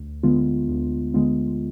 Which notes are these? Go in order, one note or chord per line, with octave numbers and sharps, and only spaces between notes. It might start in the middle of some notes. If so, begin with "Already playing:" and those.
Already playing: D2
D3 G#3 B3 F4
D2
D3 G#3 B3 F4